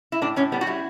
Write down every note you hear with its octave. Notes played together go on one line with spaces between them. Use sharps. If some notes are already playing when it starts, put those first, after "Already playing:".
E4
A2 D4
A2 C#4
G3 B3
F#4
G3 E4